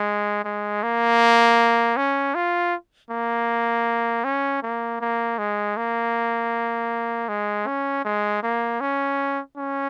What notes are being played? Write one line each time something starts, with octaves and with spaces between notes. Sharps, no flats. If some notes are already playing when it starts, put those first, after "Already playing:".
Already playing: G#3
G#3
A#3
C#4
F4
A#3
C#4
A#3
A#3
G#3
A#3
G#3
C#4
G#3
A#3
C#4
C#4